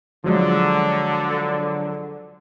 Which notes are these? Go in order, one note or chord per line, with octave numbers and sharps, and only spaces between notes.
D3 F3 F#3 G#3